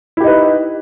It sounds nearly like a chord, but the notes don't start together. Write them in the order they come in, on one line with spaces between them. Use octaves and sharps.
E4 G4 D#4 B4